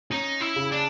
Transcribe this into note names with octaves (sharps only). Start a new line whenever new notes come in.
C#4 D#4
E4
C#3
D4